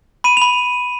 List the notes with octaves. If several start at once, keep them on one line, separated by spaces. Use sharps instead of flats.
B5 D#7
B5 F7